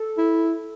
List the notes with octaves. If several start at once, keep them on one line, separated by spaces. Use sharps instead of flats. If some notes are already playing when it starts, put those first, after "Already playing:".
Already playing: A4
E4